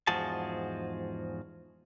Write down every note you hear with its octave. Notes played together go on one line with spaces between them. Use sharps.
E2 G#2 F3 F#4 G#4 A5